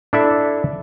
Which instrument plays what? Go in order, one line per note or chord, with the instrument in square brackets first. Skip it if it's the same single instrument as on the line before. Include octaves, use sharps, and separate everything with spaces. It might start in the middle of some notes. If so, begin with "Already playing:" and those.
[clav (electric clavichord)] D4 E4 A4 D5 E5